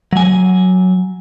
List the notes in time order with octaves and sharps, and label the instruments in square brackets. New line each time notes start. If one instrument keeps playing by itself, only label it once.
[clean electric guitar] F#3 G#5